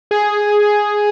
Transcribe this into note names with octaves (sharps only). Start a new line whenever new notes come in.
G#4